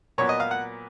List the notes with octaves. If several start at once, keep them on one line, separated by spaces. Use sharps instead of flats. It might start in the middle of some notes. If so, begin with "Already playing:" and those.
A#2 F#3 B3 C#5
D#5
F5
F#5